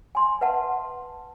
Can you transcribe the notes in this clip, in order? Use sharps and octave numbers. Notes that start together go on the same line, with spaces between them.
G#5 C6
B4 E5 F#5 A5